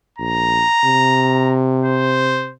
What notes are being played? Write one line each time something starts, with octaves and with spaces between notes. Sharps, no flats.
A#1 A#5
C3
C5